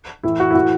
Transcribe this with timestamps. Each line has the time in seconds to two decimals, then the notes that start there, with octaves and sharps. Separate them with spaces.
0.23 A2 E3 E4
0.40 F#4
0.51 E4
0.55 A2 E3 F#4